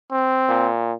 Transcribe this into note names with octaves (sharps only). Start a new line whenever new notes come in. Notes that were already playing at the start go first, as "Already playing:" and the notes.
C4
A#2